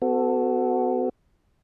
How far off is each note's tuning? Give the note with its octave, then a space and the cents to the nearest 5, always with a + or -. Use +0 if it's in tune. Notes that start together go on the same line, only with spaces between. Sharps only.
B3 +40 F#4 +0 A4 +0